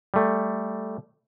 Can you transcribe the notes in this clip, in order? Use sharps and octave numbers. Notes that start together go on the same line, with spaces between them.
G3 A3